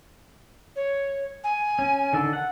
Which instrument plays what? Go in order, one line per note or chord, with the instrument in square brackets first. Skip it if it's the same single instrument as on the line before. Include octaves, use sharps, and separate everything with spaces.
[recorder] C#5
G#5
[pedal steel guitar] C#4
D3 D#3 A4
F#5